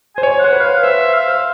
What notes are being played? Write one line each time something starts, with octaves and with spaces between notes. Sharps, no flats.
C5 G#5
C#5
F#5
C5
B4
F5
C5 E5
F5
C5